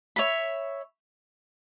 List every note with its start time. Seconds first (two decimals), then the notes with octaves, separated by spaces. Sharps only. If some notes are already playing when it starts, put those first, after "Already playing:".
0.16 C#5 E5 B5